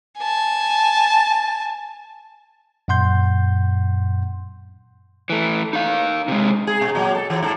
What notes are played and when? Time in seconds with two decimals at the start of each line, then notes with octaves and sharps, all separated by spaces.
0.19 G#5 A5
2.88 F#2 A#2 F#5 C6 G6
5.30 E3 A3
5.73 D#4 F5
6.28 C3 G#3
6.67 G#4
6.81 B2
6.95 A#2 F#3
7.15 A4
7.30 E2 E3
7.43 G#2 A4